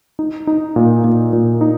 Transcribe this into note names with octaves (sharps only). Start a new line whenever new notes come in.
D#4
D#4
A#2
A#2
A#2
D#4